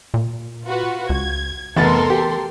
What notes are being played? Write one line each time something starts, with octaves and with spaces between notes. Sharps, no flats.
A#2
F4 F#4 B4
C#2 G#6
F1 E3 B3 A4 A#4 C6 A6
G4